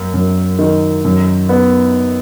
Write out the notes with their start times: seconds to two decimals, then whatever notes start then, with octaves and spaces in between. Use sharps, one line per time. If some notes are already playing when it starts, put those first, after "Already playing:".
Already playing: F#2 A#3
0.14 F#2
0.59 D#3
1.05 F#2
1.49 B3